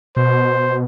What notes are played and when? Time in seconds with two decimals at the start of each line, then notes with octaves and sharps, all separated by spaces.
0.17 B2 C5